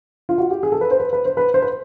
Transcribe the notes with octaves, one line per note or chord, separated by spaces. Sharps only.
F4
F#4
G4
G#4
A4
B4
C5
B4
B4
C5
B4
C5
B4